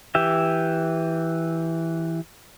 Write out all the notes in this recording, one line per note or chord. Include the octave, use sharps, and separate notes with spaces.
E3 G4 E5